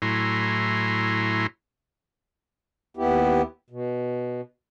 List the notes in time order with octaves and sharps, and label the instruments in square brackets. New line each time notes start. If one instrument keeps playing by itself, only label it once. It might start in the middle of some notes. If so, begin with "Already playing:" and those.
[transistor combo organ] A2 F#3 E4 G#5 A#5 C6
[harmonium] D#2 B3 E4 G4
B2